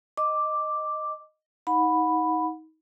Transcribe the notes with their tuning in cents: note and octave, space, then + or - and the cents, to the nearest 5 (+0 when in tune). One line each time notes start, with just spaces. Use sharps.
D#5 -5 D6 +0
D#4 +30 F#5 -25 B5 +0